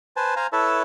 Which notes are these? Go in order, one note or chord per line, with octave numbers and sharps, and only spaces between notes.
B4 C5 G#5 A5
C5 F5 G#5 A#5
E4 A4 B4 C#5 E5 A5